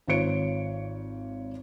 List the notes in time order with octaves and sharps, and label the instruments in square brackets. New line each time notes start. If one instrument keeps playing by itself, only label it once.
[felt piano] G#1 F4 C5 C#5 C#7 D7